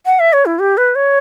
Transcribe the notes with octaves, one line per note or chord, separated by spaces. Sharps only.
F#5
E5
C#5
E4
G4
B4
C#5